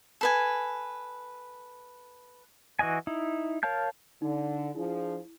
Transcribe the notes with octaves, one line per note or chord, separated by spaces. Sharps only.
A4 B4 G#5
E3 F#4 D#5 G#5
D#4 E4
A#4 C#5 F5 A5 G6
D3 D#4
F3 D4 E4 G#4